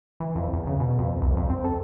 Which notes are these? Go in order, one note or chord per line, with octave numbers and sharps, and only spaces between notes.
E3
F2
E2
C#3
B2
F2
C2
F2
C4
A4